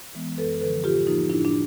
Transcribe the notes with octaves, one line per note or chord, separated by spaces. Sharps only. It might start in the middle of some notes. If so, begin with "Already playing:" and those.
E3 G#3 B3
F#2 A4 B4
D3 F3 A4 B4
A2 F4 G4
F3 A#3 D#4 F4
A2 D4 E4
D4